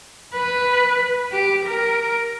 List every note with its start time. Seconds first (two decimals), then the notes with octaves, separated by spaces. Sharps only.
0.33 B4
1.31 G4
1.65 A#4